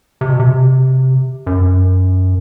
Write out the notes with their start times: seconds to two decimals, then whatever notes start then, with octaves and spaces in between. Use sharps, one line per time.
0.21 C3
0.30 B2
0.40 C3
1.47 F#2